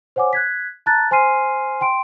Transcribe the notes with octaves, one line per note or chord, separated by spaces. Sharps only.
C5 C#5 F#5 G#5 D6
F#6 G#6 B6
A5 A#5 F#6 A6
C5 G#5 C6 F6 C7 D#7
G5 C6 D7